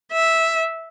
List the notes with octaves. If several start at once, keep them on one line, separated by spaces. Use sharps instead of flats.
E5